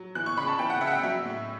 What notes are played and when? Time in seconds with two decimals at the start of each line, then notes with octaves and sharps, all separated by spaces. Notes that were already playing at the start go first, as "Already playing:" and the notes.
Already playing: F#3
0.15 E3 F#6
0.26 C#6
0.37 C#3 B5
0.48 A5
0.59 E3 G5
0.70 F#5
0.81 C#3 E5
0.87 F#5
0.92 G5
1.03 F#3 E5
1.25 A2